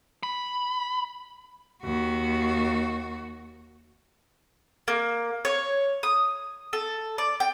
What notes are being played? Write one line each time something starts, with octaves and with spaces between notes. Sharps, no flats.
B5
D#2 F#4
A#3
C#5
D#6
A4
D5
G5